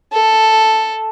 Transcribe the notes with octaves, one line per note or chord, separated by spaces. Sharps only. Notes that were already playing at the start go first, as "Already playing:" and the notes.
A4